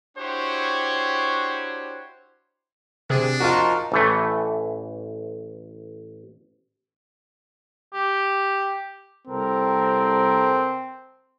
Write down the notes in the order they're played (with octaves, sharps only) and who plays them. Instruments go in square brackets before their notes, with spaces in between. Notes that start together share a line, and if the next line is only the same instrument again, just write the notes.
[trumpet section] D4 E4 F#4 G4 C5 C#5
[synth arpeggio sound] C3 G#4 [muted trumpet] D4
[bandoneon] F3 D#4 A#4 [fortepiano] F4 F#4
[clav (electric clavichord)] A1 E3 A3
[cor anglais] G4
[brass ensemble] C2 A4 A#4 [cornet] C4